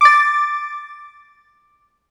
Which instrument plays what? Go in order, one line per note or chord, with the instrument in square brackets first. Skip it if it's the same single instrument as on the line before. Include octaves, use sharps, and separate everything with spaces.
[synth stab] D6 A6